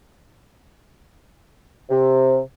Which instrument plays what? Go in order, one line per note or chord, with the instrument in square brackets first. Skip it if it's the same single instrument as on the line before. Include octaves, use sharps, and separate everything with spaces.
[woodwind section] C3